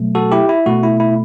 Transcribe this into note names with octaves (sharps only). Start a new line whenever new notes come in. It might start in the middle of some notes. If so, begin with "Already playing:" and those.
Already playing: B2 F#3 A3
F#4 A4
E4 G4
E4
B2 A3 F#4
E4
E4